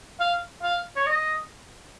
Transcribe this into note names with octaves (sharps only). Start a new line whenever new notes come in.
F5
F5
C#5
D#5